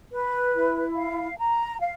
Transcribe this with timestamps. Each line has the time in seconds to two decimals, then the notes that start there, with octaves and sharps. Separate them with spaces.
0.11 B4
0.54 E4
0.96 F5
1.38 A#5
1.80 F5